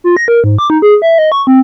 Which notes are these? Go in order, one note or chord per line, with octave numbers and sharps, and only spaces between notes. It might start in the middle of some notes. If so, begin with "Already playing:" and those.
F4
A#6
A#4
G#2
D6
D#4
G#4
E5
D#5
C#6
C4